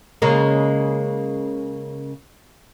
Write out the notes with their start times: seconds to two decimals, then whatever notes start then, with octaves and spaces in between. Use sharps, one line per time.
0.22 C#3 G#3 A#3